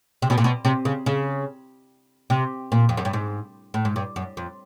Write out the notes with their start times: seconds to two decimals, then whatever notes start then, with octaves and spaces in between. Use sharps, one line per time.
0.22 C3
0.30 B2
0.38 A#2
0.44 B2
0.65 C3
0.85 C#3
1.06 C#3
2.30 C3
2.72 A#2
2.89 F2
2.97 F#2
3.05 G2
3.13 G#2
3.74 A2
3.85 G#2
3.96 G2
4.16 F#2
4.37 F2